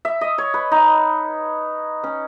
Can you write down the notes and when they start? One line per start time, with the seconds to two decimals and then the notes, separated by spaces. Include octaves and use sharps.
0.05 E5
0.21 D#5
0.38 C#5
0.54 B4
0.72 D#4
2.04 C#4